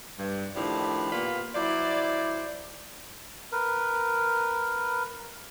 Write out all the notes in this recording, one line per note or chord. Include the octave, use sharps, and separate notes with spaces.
G2
A2 D#3 F3 D4 E4 G4
A#2 A#3 B3 F4 G4 B5
F#3 E4 C5 D5
A#4 B4